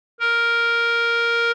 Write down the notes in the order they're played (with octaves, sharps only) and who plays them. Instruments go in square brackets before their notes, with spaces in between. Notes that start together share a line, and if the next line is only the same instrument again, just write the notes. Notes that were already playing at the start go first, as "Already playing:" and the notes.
[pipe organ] A#4